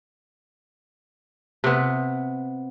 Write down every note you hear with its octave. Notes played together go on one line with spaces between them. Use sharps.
C3 B3